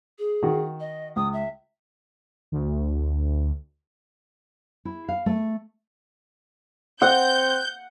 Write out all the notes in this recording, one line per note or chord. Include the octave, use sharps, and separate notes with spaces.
G#4
D#3 F#4
D#5
C#2 D#6
E5
D2
E4
F5
A3
C4 F#5 G6